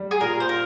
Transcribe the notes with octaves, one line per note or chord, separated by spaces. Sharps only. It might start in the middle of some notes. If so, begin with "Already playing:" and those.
Already playing: G3
G#4
A#2 A#4
C5
F4 A#4